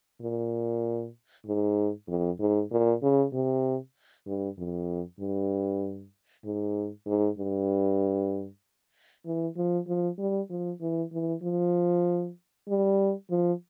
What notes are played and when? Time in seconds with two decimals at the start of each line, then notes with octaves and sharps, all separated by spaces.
0.21 A#2
1.46 G#2
2.08 F2
2.40 G#2
2.71 A#2
3.03 C#3
3.33 C3
4.27 G2
4.58 F2
5.20 G2
6.45 G#2
7.07 G#2
7.39 G2
9.26 E3
9.57 F3
9.87 F3
10.18 G3
10.50 F3
10.81 E3
11.12 E3
11.43 F3
12.68 G3
13.31 F3